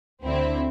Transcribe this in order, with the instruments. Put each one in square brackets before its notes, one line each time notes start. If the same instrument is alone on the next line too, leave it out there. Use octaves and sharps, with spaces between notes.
[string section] D2 D3 C4 E4